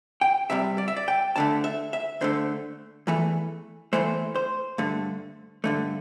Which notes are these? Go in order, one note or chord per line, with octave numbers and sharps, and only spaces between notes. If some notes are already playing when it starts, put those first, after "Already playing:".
G5
C2 C3 G3 E5
D5
E5
D5
G5
D2 D3 A3 A5
E5
E5
D2 D3 A3 C5
E2 E3 A3
E2 E3 A3 C5
C5
G2 D3 A3
G2 D3 A3